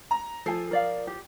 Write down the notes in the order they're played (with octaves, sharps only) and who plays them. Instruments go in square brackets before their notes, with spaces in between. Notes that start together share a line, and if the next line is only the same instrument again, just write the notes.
[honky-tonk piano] A#5
[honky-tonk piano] F3 C7 [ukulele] A4 G#5
[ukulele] A#4 D5 F5
G4